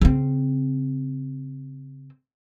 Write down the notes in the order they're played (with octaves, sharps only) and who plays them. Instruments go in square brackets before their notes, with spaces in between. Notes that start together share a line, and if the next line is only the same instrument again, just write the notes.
[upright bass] C#3 C4